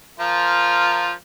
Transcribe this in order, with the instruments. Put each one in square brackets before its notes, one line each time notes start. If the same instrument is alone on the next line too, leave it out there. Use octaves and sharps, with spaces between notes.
[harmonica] F3 F4 A#4